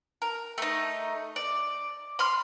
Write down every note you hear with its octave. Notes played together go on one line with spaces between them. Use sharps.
A#4
A3 D#4
D5
B5 C6 F6